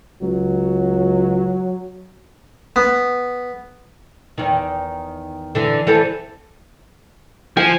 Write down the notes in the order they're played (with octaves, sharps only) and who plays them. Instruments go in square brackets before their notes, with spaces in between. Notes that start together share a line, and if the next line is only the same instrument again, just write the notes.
[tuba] C#2 [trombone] F#3
[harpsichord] B3
[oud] E2 D#3
D3 E3
E3 C4 A4
[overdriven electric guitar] F3 [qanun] G#5